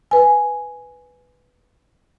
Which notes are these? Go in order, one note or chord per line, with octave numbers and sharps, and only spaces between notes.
B4 G#5